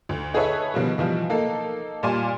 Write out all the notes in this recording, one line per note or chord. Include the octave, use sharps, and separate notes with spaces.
D2
D#4 G#4 A4 B4 C#5 E5
B2 D#3 F3 G3
B2 E3 F3 G3
A#3 D#4 A4
A#2 G3 D5 G#5 C6